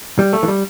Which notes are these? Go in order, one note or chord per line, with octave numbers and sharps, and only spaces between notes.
G3
A3
E3
G3